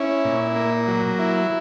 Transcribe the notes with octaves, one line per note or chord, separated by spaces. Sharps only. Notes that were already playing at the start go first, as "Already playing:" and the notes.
Already playing: C#4 E4
A#2
A#3
F#3
E4